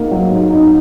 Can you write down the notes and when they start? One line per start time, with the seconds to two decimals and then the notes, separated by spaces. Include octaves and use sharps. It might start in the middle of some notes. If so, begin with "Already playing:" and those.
Already playing: G#2 A#3 D#4
0.11 F#3
0.32 G#2
0.50 D#4